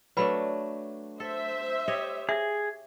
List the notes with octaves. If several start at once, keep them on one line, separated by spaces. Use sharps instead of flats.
F#3 A3 D4 B4 B5
A4 C5 E5
G4 C#5 D#5
G#4 E5